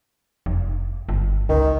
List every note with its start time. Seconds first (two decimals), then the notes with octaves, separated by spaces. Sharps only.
0.46 F1
1.09 G1
1.49 C#2 D#3